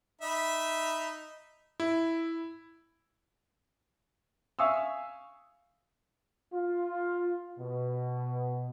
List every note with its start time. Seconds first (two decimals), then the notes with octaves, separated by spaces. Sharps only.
0.21 D#4 E5 B5
1.80 E4
4.59 E5 F5 G#5 C#6 D#6 E6
6.53 F4
7.59 B2